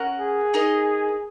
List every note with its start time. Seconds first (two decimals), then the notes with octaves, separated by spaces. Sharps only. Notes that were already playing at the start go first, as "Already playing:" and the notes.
Already playing: C#4 A#4 F#5
0.19 G#4
0.54 D#4 A#4 D#5